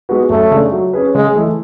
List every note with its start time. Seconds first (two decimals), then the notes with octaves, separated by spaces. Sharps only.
0.09 G#3 B3 F#4 B4
0.30 F#2 A3
0.51 C#3 G#3 D4 A4
0.72 F#3
0.93 C#4 G#4 B4
1.15 C#3 G#3
1.36 E3 A3 E4